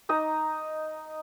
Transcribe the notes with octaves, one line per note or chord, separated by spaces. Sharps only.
D#4 D#5 A#5